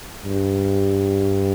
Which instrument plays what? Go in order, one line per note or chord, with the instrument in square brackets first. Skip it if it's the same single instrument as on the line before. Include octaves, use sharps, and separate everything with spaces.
[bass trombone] G2